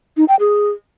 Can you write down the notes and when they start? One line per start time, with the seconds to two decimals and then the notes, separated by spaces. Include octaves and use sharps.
0.17 D#4
0.28 G5
0.40 G#4